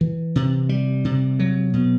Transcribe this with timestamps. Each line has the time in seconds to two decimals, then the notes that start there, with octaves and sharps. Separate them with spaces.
0.01 E3
0.36 C3
0.69 G3
1.04 C3
1.39 F#3
1.73 B2